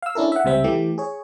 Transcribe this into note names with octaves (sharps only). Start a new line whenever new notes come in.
F5 E6
C#4 D4 E4 A4 A#4
E5 F#5
C#2 C3 G3 C4 E5
E3 A3 G4
G#4 C#5